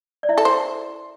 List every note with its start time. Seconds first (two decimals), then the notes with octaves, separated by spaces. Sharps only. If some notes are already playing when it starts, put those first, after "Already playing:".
0.23 D5
0.29 E4 E5
0.38 A4
0.45 C5